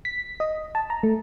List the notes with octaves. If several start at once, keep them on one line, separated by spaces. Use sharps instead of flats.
B6
D#5
A5
A#5
A3